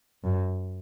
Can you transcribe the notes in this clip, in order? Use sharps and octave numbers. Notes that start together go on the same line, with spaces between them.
F#2